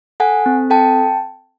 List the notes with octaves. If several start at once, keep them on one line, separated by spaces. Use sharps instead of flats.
A4 F#5 G#5
C4
A4 G5 A5